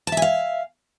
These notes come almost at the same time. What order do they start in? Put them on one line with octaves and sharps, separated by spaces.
A5 E5 G#5 F5